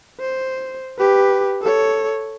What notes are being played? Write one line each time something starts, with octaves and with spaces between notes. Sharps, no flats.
C5
G4 B4
A4 C#5